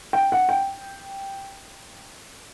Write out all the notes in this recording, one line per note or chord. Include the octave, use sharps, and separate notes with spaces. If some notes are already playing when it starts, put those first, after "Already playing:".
G5
F#5
G5